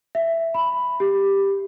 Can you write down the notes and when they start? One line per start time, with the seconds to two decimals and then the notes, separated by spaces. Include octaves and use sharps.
0.15 E5
0.54 B5
1.00 G4